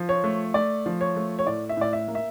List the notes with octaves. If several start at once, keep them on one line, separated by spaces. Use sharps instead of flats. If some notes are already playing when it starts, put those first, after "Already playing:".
Already playing: F3
C#5
A3
A3 D5
F3
C#5
A3
C#5
A2 D5
E5
A2 D5
E5
A#3
E5